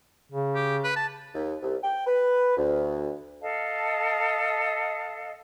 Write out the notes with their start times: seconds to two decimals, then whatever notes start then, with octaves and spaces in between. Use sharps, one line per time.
0.32 C#3
0.55 G4
0.84 B4
0.96 A5
1.34 D#2
1.62 C2
1.84 G5
2.07 B4
2.57 D2
3.41 A4 D#5 F5 A5